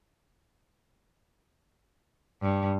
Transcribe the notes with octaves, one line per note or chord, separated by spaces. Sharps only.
G2